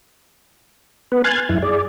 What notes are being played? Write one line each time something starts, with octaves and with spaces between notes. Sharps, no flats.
B3 B4
G#5 C6 F6 F#6 G#6 A6
F#2 E4
G#4 D5